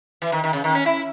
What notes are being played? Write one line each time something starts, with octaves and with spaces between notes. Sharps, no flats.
E3
D#3
D#3
C#3
D#3
C#4
E4